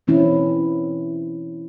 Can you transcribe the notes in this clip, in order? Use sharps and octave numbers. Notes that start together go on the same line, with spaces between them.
B2 E3 C4 C#4 E4